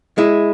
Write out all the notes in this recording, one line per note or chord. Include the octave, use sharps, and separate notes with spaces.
G#3 E4